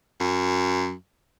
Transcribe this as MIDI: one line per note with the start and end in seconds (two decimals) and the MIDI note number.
0.20 0.93 42